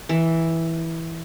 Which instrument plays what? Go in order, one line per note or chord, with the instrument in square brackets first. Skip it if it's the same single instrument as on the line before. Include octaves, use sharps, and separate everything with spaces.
[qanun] E3